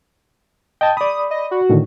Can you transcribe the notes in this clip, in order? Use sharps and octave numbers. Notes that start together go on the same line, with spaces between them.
D#5 G5 A5
D5 B5 D#6
D#5
F#4
A2 D3 D#3